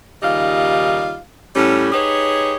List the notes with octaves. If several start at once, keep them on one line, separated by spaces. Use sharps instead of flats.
D#2 C#3 G3 D#4 F4 F5
A2 G3 C#4
D#4 G4 G#4 B4 C#5